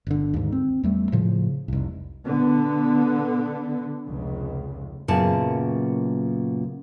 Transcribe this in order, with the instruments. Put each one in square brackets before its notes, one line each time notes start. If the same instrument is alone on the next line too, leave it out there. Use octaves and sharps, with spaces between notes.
[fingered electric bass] G1 D3
D#2 G#2
C4
E2 G3 A3
A2 C#3 F3
F1 C2
[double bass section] D3 B3
F1 C#2
[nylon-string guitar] F#2 A#2 C#3 B3 A5